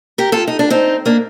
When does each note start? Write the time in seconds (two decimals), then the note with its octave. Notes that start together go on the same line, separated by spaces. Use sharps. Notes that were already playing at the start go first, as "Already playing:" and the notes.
0.18 G4 A#4
0.32 F4 A4
0.47 D#4
0.59 D4
0.70 C4 D#4
1.06 A#3 D4